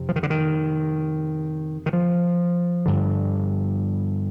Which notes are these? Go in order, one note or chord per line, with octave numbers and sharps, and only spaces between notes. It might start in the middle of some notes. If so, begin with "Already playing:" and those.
Already playing: F2 C3
F3
D#3
D3
D#3
D#3
F3
G2 D3